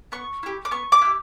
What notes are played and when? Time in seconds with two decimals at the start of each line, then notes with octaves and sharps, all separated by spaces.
0.12 B3 C#6
0.43 E4 G4
0.65 D6
0.71 B3 C#6
0.92 D6
1.02 E4 G4